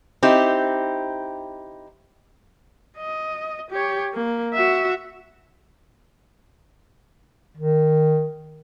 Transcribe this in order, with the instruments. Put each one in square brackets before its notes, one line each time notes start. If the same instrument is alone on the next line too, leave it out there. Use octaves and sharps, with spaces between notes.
[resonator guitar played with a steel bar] C4 D#4 E4 G4
[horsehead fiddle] D#5
G4 C#5
A#3
F#4 E5
[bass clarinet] D#3